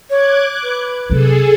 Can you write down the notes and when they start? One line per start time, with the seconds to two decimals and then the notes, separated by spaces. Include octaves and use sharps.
0.10 C#5 D6 F#6 G#6
0.63 B4
1.10 C3 F#3 G#4 A4